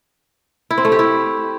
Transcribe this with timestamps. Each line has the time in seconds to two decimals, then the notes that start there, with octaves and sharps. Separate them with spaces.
0.70 E4
0.78 C4
0.85 A3
0.92 G4
0.99 E4